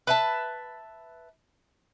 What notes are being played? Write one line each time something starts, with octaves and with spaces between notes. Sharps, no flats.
B4 E5 A5